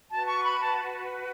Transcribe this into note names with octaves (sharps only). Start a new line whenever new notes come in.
F#4 B4 A5
C#6
B5
A5